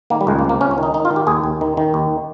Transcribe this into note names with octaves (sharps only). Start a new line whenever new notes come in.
D#3 A#3
G3
C#2 G#3
A#3
C3
A#3
C#2 C#4
C#4
D#3 D#4
D#3 D#4
F4
D#3
G4
D#2 G#4
D#2
D#3
D#3
D#2